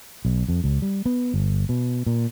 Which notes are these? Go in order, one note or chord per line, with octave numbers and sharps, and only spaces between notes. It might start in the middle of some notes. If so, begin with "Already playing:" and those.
B1
F2
C#2
G3
B3
G1
B2
A#2